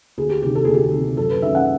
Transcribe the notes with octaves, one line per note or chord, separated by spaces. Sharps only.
D2 G#4
G4
C3 D#3 G4
A4
D2 G#4
G4
G#4
C3 D#3
F#2 A4
B4
D#3 G#3 C#4 E5
F#5